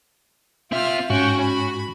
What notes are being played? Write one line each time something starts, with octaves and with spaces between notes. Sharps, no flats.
C4 F4 E5 F6
G#2 C#4 F#4 G5
B5